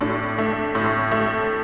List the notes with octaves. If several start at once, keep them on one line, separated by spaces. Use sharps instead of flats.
A2 D4
A3
A2
A3